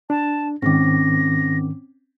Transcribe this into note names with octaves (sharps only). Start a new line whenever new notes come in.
D4 A5
G#2 D#3 C4 C#4 D6 A#6